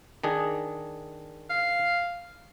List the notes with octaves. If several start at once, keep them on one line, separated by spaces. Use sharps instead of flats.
D#3 D4 G#4
F5